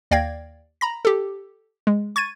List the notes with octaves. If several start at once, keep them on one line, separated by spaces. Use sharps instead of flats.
D#2 D5 F5 G5 G#6 A#6
A#5 B5 A#6
G4 A4
G#3
C#6 G#6 A6 D#7